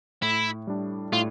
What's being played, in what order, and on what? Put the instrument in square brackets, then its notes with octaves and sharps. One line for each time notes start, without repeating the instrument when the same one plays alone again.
[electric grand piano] A2 [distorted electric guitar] E4
[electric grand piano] G3 D4
[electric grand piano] A2 [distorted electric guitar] F4